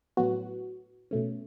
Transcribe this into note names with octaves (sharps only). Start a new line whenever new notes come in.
A2 F#3 B3 F#4
B2 A3 C#4